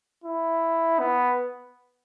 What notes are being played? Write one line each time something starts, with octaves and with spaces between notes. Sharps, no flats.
E4
B3